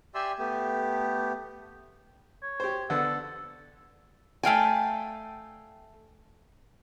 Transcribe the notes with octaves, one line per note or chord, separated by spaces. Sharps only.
G4 D5 E5 G#5 C6 E6
A3 B3 G4
C#5
G4 C5
D3 B3 A4
A3 F5 G5 G#5